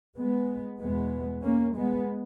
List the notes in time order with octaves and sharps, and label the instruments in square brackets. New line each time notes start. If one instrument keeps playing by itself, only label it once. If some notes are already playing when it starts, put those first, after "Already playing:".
[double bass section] G#3 B3
E2 B2 G#3 B3
A#3 C#4
G#3 B3